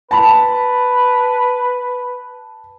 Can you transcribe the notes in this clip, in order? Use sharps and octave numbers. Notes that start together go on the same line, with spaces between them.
B4 A5 B5